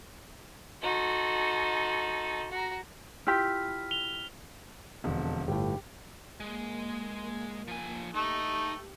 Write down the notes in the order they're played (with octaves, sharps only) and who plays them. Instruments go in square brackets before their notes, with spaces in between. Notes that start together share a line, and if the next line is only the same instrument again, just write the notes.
[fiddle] D#4 C6 [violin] F#4 A4
[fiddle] F#4 A#5
[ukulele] E4 F4 G4 [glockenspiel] F6 B6
[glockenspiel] F7 G7
[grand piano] E1 F2 D3
[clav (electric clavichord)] G1 A2 [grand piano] G4
[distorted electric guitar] G#3 [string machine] A#3
[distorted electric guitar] F3 G#5
[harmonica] A3 [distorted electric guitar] D#4 [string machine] G4